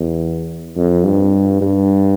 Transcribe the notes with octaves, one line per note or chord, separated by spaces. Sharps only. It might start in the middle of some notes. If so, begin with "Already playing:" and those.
Already playing: E2
F2
G2
G2